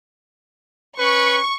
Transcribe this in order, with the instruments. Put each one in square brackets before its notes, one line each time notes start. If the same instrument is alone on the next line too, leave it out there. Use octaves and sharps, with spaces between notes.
[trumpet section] C#4 B4 [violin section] C#6